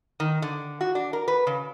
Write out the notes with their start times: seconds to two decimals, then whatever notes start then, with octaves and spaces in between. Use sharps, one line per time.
0.20 D#3
0.42 D3
0.81 F#4
0.95 D4
1.13 A#4
1.28 B4
1.47 C#3